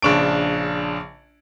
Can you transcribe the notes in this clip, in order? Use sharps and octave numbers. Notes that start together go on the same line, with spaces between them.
A#1 C#3 D4 C#6 D7